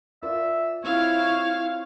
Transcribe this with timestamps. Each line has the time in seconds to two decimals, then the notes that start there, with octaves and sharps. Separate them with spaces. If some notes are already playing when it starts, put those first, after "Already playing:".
0.23 F4 A#4 D5 E5
0.84 C4 E4 F4 C#5 F5